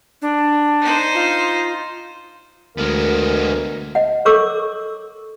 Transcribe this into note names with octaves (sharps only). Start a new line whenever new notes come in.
D4
D#4 C5
F4
D2 G#3 B3 A#4
D#5 F#5
A4 A#4 C#5 C#6 D6 E6